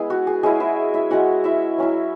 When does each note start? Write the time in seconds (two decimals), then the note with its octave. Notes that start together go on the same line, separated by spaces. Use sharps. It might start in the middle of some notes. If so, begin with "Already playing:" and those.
Already playing: G#3 B3 E4 G#4
0.10 F#4
0.27 G#4
0.43 G#3 C#4 E4 G#4
0.60 E4 E5
0.94 E4 E5
1.10 G#3 C#4 E4 F#4 F#5
1.44 E4 E5
1.78 F#3 C#4 E4